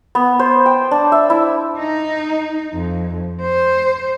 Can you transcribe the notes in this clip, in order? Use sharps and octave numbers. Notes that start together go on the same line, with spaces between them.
B3
C5
G5
D4
E5
E4
D#4
F2
C5